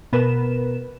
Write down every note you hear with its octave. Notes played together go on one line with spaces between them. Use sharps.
B2 B3 A#4 B4 E7